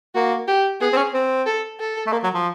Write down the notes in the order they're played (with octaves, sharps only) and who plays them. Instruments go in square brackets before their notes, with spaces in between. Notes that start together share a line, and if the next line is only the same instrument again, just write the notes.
[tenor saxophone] A#3 [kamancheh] F#4
[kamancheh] G4
[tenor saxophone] B3 [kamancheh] G#4
[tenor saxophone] C4
C#4
C4
[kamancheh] A4
A4
[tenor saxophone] A3
A#3
F#3
F3